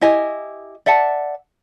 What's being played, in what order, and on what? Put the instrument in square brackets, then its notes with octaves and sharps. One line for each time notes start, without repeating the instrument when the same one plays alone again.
[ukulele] E4 G4 D#5 G#5
D5 E5 F#5 A5